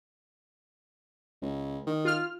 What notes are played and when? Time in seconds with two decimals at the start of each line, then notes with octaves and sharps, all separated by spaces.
1.42 C#2
1.87 D#3
2.05 F4 F6